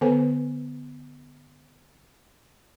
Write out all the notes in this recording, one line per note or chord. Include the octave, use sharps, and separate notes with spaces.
D3 B3 A4 B4 C5 G#5